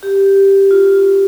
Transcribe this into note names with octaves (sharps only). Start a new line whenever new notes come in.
G4
F4